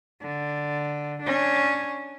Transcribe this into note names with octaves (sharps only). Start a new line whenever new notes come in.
D3
C#4 D4